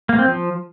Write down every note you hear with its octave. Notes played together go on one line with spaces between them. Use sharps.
A#3
C4
F3